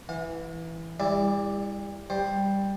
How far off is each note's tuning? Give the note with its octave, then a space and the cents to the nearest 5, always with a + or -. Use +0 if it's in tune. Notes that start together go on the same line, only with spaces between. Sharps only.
E3 +0 F5 +45
G3 +40 E4 +0 D5 +0
G3 +5 C5 +10